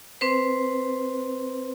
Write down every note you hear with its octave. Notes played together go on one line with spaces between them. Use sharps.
C4 B4 C5